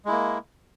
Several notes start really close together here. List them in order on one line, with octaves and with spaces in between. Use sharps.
G#3 E4 A#3